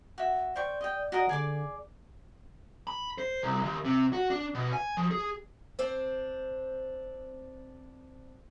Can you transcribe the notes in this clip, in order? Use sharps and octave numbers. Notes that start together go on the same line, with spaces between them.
F#4 E5
C5 D5 G5 C#6
D#5 G5
F#4 A#4 D#5
D3 G#4 D5 D6
B5
C5
C2
D#2
C3
F#4
D4
B2
G#5
F3
G#4
C4 D4 C5